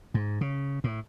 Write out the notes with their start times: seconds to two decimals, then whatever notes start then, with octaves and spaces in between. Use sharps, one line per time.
0.14 G#2
0.41 C#3
0.84 A2